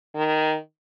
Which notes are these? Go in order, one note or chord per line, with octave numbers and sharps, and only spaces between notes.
D#3